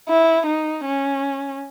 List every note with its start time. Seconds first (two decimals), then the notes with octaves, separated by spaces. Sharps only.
0.09 E4
0.47 D#4
0.85 C#4